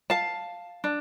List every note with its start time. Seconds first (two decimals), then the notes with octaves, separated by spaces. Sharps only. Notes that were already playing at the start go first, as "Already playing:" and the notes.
0.10 F5 A5
0.84 D4